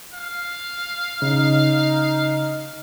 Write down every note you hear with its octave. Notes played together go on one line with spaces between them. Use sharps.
F5
C#3 D#4